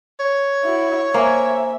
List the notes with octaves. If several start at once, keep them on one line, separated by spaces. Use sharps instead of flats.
C#5
E4 F#4
A#3 C5 E5 G#5 A#5